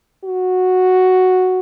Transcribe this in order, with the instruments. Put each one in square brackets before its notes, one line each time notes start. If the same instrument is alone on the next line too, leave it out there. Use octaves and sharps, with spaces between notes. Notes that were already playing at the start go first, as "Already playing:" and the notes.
[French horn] F#4